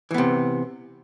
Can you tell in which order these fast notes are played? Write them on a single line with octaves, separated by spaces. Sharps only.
E3 B3 C3